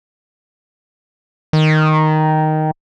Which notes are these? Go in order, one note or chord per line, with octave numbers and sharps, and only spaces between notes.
D#3